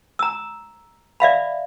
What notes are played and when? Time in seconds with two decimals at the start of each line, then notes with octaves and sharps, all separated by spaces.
0.19 A#5 E6
1.20 D5 E5 F5 B5